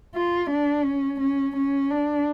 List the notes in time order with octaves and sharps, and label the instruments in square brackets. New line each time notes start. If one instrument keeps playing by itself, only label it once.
[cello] F4
D4
C#4
C#4
C#4
D4